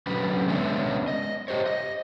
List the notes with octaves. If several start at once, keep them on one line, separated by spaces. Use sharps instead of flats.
D3 F#3 C#4 B4
G#3 B3 C#4 D4 D5 E5
D#5
G4 C5 C#5
D#5